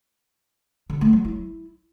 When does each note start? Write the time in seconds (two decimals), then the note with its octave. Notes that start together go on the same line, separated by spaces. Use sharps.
0.90 D3
1.01 A3
1.13 F#3
1.25 E4